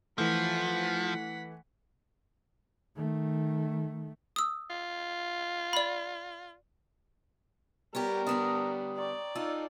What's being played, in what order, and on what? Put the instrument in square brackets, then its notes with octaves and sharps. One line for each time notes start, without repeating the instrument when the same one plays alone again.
[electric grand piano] E3 A3 [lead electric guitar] F3 [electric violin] F#5 B6
[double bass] D#3 A3
[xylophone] D#6 E6
[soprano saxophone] F4
[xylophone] D5 B5
[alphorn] G3 [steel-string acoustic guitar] B3 G4 [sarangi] A#4 [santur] C#5
[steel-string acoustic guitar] D3 B3 D4 [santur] D#6
[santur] A#4 G5 C#6 [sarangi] D5
[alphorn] D#4 [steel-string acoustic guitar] F4 A4 [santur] E6